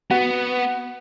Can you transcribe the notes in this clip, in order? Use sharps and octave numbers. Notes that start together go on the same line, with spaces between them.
B3 F#4